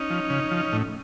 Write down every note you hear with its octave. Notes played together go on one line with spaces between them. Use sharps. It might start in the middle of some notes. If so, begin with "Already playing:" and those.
Already playing: C#4 D#4
F3
C#3
F3
A2